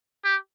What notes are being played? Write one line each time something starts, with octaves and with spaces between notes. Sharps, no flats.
G4